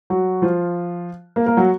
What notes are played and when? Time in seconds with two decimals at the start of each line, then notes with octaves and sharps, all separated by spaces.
0.10 F#3 F#4
0.42 F3 F4
1.36 A#3 A#4
1.46 A#3 A#4
1.57 F#3 F#4